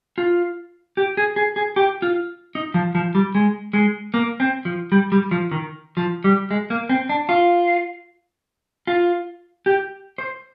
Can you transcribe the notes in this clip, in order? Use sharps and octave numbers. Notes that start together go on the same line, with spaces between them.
F4
G4
G#4
G#4
G#4
G4
F4
D#4
F3
F3
G3
G#3
G#3
A#3
C4
F3
G3
G3
F3
D#3
F3
G3
G#3
A#3
C4
D4
F4
F4
G4
C5